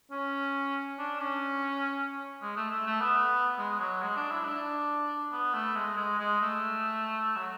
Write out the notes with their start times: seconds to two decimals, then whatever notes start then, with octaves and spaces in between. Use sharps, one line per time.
0.11 C#4
0.99 D4
1.20 C#4
2.42 G#3
2.57 A3
2.71 A3
2.87 A3
3.01 B3
3.59 G#3
3.80 F#3
4.02 G#3
4.16 D4
4.31 E4
4.45 D4
5.32 B3
5.54 A3
5.76 G#3
5.97 G#3
6.19 G#3
6.41 A3
7.37 F#3